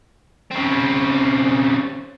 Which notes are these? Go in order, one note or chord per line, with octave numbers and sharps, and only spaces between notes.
C#3 C4